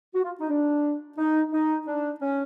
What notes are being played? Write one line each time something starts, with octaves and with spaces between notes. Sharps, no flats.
F#4
F4
D#4
D4
D#4
D#4
D4
C#4